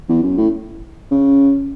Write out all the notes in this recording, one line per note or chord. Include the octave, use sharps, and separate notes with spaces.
E2
F#2
A2
C#3